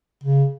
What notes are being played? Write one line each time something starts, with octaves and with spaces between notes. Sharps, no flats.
C#3